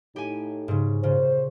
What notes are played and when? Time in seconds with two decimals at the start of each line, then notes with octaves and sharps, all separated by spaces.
0.16 A2 D#4 G4 G#5
0.68 G#2 C#3
1.03 A#2 C#3 C5